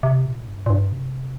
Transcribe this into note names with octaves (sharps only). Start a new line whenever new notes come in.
C3
A#2
G2
A#2
G2
C3